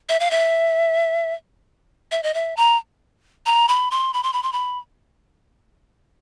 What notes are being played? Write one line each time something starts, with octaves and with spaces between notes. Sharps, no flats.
E5
F5
E5
E5
D#5
E5
A#5
A#5
B5
C6
B5
C6
B5
C6
B5